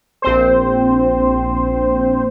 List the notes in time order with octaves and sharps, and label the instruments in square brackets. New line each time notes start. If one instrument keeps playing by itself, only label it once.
[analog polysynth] A#1 C4 C5